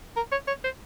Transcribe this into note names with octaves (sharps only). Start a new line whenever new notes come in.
A#4
C#5
C#5
C5